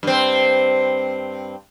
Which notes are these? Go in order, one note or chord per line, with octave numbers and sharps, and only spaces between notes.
G2 C4